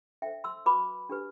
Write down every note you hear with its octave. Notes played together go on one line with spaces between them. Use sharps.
D4 A4 C5 E5 G5
C6 E6
F#4 B4 B5 D6
D4 G4 B4